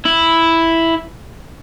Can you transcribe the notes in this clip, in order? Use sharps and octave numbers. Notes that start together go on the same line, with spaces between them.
E4